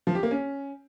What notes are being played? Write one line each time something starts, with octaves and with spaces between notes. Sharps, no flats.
F3
G4
A#3
C#4